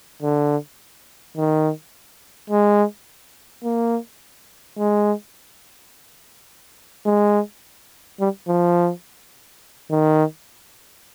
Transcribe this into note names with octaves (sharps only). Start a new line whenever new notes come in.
D3
D#3
G#3
A#3
G#3
G#3
G3
F3
D#3